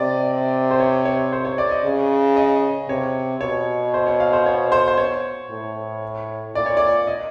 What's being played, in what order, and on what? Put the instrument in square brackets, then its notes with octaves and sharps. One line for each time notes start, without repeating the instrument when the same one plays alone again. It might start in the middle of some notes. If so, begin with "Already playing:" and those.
Already playing: [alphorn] C3 [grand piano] D5 D#5
[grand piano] C5
C#5
C#5
C5
C#5
D5
D#5
[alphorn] C#3
[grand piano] D#5
[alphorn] C3 [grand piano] C#5
[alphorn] B2 [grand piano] C#5
[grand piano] C5
C#5
F5
C5
C#5
C5
C5
C#5
[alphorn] A2
[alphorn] A#2 [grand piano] D5
[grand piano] C#5
D5
D#5